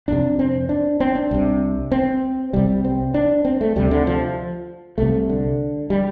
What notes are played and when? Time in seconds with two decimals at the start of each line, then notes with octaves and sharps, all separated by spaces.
0.08 F1 F2 C3 D4
0.39 C4
0.69 D4
1.00 C4
1.15 D4
1.31 C2 C3
1.92 C4
2.53 C2 C3 G3
2.85 C4
3.14 D4
3.45 C4
3.61 A3
3.76 D2 C3 G3
3.91 D3
4.07 F3
4.98 C2 C3 A3
5.29 D3
5.90 G3